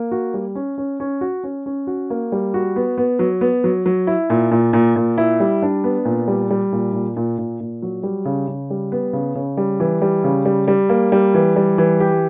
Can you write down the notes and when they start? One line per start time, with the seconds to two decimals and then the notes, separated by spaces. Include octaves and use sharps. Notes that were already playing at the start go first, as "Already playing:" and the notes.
Already playing: A#3
0.12 F#4
0.34 G3
0.55 C#4
0.78 C#4
1.00 C#4
1.21 F#4
1.44 C#4
1.66 C#4
1.87 F#4
2.10 A#3
2.32 G3
2.54 F#4
2.76 B3
2.98 B3
3.19 F#3
3.41 B3
3.64 F#3
3.86 F#3
4.07 E4
4.30 A#2
4.51 A#2
4.73 A#2
4.96 A#2
5.18 E4
5.40 G3
5.62 D4
5.84 B3
6.05 A#2
6.28 G3
6.50 G3
6.72 A#2
6.93 A#2
7.16 A#2
7.38 A#2
7.60 A#2
7.82 F#3
8.03 G3
8.25 C#3
8.48 C#3
8.70 G3
8.92 B3
9.13 C#3
9.35 C#3
9.57 G3
9.80 E3
10.02 G3
10.24 C#3
10.45 G3
10.68 G3
10.89 A#3
11.12 G3
11.34 E3
11.56 G3
11.78 E3
12.00 G4